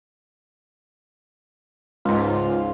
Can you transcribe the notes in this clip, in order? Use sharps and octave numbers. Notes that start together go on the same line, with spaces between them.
C#2 G#2 F4